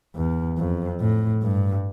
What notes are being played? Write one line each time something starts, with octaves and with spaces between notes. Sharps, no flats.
E2
F2
A2
G2